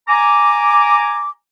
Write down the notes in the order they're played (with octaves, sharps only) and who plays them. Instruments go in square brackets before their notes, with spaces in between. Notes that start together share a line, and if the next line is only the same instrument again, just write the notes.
[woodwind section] G#5 A#5 D6